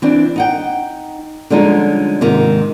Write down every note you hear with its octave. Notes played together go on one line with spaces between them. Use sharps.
E3 C4 D4
D#4 F#5 G5
D3 F3 G3 G#3 C#4 D#4
G#2 C3 D#3